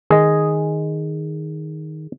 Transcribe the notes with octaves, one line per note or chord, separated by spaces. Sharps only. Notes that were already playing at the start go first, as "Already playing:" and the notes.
D#3 G#4 D#5